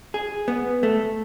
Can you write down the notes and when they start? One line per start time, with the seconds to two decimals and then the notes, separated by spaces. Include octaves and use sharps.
0.14 G#4
0.48 B3
0.83 A3